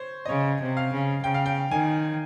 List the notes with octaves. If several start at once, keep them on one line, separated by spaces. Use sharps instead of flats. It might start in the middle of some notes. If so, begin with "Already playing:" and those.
Already playing: C5 C#5
D#5
C#3 C#5
C3
F5
C#3
C#3 G5
F5
G5
D#3 G#5